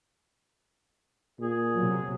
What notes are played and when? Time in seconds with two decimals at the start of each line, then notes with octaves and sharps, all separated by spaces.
1.40 A#2 G#4
1.76 C3 F#3